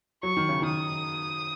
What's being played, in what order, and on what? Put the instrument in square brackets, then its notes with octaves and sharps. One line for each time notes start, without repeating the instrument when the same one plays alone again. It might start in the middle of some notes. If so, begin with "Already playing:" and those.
[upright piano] F#3 [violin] C#6
[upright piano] D#3
C#3
[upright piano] D#3 [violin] D#6